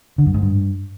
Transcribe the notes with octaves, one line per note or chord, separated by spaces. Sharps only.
D3
F#2
G#2
G2